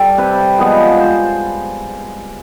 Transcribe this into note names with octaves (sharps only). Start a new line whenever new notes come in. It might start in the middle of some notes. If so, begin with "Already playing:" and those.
Already playing: G3 A4
C3 B4
F3 G#3 B3
C5